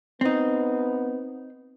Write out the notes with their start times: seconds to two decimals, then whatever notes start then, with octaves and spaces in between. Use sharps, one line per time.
0.21 B3 C4 D#4